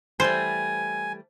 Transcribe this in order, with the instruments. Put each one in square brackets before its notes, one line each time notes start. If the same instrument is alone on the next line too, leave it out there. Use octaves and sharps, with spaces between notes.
[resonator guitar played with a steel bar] E3 G3 A3 [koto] C5 [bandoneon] G#5